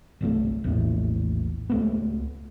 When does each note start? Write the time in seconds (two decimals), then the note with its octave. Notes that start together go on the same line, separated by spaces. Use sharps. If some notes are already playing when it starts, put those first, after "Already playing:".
0.21 G1 C2 D3 A3
0.64 A#1 E2 A2
1.70 C#2 A3 B3